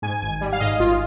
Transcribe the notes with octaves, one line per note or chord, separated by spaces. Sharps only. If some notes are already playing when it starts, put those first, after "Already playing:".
G#2 G#5
G#1 G#5
G3
F5
G#2 D#5
G#1 F4